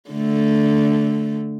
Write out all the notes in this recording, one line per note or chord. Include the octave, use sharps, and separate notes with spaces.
D3 A3